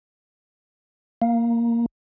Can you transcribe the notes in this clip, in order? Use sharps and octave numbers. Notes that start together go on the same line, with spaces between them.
A#3